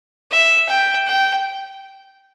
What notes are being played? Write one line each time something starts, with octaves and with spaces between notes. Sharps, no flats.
E5
G5
G5